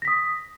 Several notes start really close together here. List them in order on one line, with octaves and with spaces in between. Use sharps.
A#6 B6 D#6